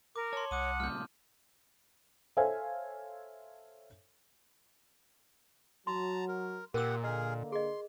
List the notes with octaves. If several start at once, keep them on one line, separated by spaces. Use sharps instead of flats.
A#4 D6
C#5 A5 C6
C2 F#5 D6 D#6 D#7
G2 A#2 C#3 F6 G6
A4 C5 C#5 E5 F5 G#5
F#3 A5 A#5 C6
A#4
A#2 G4 A#4 F#5 E6
D3 A#3 G#4 A#4 D#5
G#4 D#5 C6